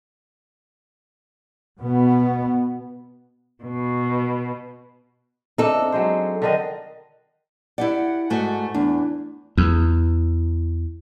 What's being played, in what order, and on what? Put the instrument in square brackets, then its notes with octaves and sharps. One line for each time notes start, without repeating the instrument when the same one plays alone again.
[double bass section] B2 B3
[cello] B2
[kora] A3 D4 D#4 [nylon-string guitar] C4 A4
[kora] F#3 G#3 C5
D3 D#3 D#5
[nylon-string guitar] E4 G4 D5 [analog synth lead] F#5
[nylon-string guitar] G#2 A3 F#4
[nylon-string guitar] E2 [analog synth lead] D4
[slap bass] E2